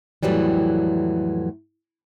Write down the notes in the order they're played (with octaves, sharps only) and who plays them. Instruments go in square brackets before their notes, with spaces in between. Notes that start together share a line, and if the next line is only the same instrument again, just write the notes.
[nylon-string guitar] F2 A2 E3 F#3 G3